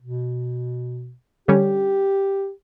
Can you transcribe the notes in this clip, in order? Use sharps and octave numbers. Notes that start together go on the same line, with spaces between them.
B2
D3 G3 C#4 G4